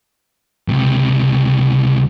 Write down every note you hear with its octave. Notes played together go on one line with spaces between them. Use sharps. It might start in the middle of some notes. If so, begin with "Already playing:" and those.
C#2 C3